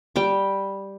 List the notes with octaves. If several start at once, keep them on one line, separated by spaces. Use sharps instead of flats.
G3 G5 D6